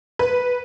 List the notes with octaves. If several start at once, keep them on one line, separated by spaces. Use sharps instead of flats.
B4